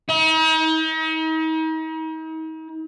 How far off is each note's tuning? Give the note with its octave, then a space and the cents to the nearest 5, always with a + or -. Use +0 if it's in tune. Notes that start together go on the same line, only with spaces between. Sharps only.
D#4 +40